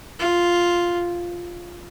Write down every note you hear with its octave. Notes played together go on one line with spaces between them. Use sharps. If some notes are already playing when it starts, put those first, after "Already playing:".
F4